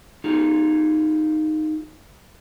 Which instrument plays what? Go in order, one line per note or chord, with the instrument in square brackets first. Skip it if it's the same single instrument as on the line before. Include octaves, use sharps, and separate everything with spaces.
[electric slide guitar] D#4 F4 G#4